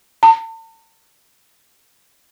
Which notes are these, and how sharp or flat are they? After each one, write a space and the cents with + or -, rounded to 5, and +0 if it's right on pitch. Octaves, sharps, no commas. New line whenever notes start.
A5 +40